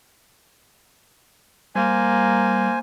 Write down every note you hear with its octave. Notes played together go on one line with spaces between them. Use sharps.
G3 A#3 C5 G#5